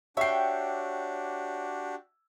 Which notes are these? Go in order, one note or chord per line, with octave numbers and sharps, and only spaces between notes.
D4 F#4 G4 C#5 E5 G5 C7